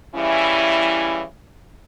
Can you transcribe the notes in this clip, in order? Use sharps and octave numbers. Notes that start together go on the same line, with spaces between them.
C#3 E3 G3 C#4 E4